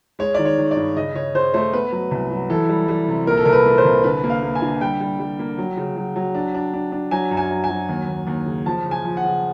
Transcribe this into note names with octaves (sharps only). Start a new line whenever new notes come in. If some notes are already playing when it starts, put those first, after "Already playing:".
G#3 C#5
D#3 D5
C#5
D#3
D5
G2
C#3 D#5
C#3 C#5
C#3 C5
A3 C5
B3 B4
F#3
C2
F#3
E3 A4
G3
G3
C3
A#2 A#4
A4
C2 A#4
B4
A#2
C5
C2
D3 B4
A#3
F5
A#3
G#5
D3
G3 G5
G3
G3
A#3
F#3
C#3
F#3
F#3
D4
D4
D4
D4
F#3 G#5
F#2
G#5
F#3
G#5
F#3
D#2
D#2
D#2
C#3
F3 A5
C#3
G#5
F3
F#5
C#3